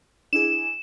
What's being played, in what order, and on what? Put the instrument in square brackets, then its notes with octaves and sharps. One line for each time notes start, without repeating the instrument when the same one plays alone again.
[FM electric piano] D4 E4 G#4 [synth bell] E7